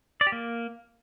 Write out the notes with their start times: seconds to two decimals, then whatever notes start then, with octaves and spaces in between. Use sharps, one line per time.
0.21 D5
0.27 G4
0.32 A#3